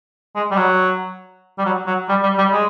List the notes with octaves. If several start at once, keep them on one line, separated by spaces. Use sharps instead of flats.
G#3
G3
F#3
G3
F#3
F#3
G3
G3
G3
G#3